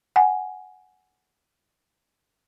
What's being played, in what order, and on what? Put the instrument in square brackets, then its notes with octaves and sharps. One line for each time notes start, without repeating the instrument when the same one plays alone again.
[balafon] F#5 G#5